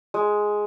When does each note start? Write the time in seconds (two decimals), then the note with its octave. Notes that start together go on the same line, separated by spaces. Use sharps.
0.14 G#3